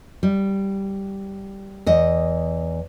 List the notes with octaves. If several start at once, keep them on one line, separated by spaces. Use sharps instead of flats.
G3
E2 D#5